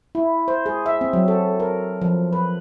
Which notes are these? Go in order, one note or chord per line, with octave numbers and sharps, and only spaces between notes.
E4
C5
G#4
E5
C4
F#3
A4
A#4
F3
B4